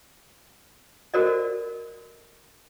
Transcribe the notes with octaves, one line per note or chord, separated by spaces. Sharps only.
F#4 A4 A#4 C5 D5 D#5